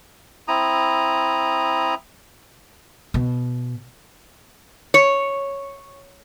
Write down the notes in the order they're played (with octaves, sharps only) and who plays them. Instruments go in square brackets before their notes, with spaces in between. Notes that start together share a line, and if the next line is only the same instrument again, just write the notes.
[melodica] C4 E4 A#5 D#6
[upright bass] B2
[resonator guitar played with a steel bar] C#5